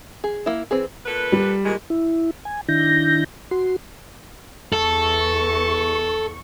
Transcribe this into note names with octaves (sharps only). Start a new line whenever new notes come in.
G#4
A#3 E4
E3 C4 G#4
A#2 A4 B4
G3
A#2 D#3 G#3
E4
G#5
D#3 D4 E4 G6 A#6
F#4 C6
E2 A4 C#6